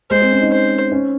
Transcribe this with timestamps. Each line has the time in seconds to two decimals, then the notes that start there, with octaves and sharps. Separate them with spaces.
0.11 G#3 C5
0.22 C4
0.32 C#4
0.41 D#4
0.52 C5
0.92 C#4